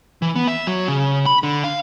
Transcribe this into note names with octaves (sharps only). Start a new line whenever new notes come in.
E3
B3
E5
F#3
C#3
B5
D3
F5